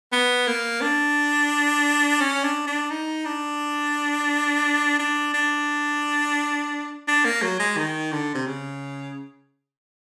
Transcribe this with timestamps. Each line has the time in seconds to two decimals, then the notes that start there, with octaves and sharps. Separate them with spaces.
0.12 B3
0.47 A#3
0.82 D4
2.21 C#4
2.44 D4
2.67 D4
2.90 D#4
3.25 D4
4.99 D4
5.34 D4
7.08 D4
7.25 A#3
7.42 F#3
7.59 G#3
7.77 D#3
8.12 D3
8.35 C3
8.46 C#3